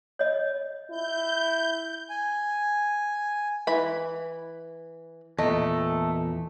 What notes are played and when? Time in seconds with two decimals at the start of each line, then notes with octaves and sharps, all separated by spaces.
0.19 C#5 D#5
0.91 E4 G6
2.10 G#5
3.67 E3 B5
5.39 E2 A#2 A3 D#5